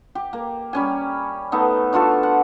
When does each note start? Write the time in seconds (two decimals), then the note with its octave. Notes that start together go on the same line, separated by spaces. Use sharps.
0.15 G4
0.33 A#3
0.73 G3 C#4 G#5
1.52 A3 B3 D#4
1.93 D4 F4 F#4 A4
2.23 F#5